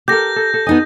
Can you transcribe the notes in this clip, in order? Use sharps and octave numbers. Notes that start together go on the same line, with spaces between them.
G4 A4 A#4 G6 A#6
A4
A4
B3 D#4 D#5 G#5